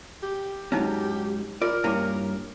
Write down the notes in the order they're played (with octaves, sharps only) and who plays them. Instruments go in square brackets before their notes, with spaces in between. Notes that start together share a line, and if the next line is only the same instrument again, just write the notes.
[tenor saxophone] G4
[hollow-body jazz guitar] G#2 F#3 C#4 [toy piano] D#4 E4
[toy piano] F4 [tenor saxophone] A#4 [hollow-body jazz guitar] D5
[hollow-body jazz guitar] G2 A#3 C#4 [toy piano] E4 D6